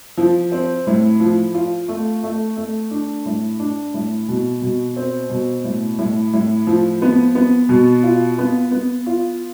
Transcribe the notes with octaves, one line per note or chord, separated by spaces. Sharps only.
F3
C4
A2
F3
F4
A3
A3
A3
D4
A2
D4
A2
B2
B2
C4
B2
A2
A2
A2
F3
B3
B3
B2
F4
B3
B3
F4